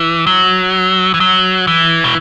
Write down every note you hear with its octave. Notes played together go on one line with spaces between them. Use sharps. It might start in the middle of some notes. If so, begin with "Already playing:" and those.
Already playing: E3
F#3
E3
F#3
E3
B2